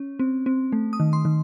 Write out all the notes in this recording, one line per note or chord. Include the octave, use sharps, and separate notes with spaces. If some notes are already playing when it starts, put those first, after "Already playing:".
Already playing: C#4
C4
C4
A3
D#6
D#3
C6
D#3